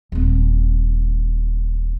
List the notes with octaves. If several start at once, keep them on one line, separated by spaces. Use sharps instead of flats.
D#1 C4